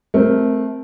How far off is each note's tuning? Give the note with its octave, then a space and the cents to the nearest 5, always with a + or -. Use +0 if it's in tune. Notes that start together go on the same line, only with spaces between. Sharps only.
A3 -15 C4 +0 A#4 +0